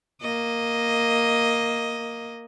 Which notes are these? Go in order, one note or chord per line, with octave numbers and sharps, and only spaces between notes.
A#3 D#5